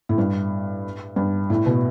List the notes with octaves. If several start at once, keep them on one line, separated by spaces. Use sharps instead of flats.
A2
G2
G2
A2
B2